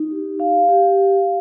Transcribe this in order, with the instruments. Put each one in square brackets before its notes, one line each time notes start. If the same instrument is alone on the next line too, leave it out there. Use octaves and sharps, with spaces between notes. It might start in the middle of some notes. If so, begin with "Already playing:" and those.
Already playing: [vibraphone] D#4
G4
F5
G4
F5